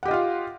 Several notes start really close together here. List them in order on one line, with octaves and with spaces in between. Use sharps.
F#5 G4 D#5 F4 F5